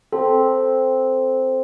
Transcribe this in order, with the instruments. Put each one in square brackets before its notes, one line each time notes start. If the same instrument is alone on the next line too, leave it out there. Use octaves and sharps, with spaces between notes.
[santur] C4 [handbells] A4